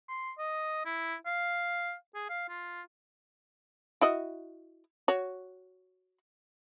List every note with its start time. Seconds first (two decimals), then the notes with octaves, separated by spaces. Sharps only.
0.09 C6
0.38 D#5
0.86 E4
1.26 F5
2.15 G#4
2.29 F5
2.49 F4
4.01 E4 F#4 D#5
5.08 F#4 C#5